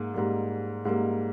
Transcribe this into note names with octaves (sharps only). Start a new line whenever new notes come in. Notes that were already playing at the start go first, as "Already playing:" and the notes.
Already playing: G#2 A#3
G#2 G3 A#3
G#2 G3 A#3